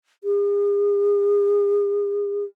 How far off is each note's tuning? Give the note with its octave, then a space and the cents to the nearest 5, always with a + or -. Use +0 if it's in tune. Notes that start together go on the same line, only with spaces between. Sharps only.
G#4 -40